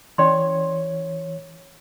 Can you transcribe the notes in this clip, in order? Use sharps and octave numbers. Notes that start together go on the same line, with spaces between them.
E3 C#4 C#5 D5 C6